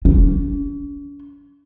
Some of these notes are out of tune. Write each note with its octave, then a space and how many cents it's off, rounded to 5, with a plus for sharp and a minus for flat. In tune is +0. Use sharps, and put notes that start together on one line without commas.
C#4 +45